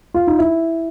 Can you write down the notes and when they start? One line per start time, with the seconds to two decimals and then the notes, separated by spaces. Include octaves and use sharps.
0.14 F4
0.27 D#4
0.39 E4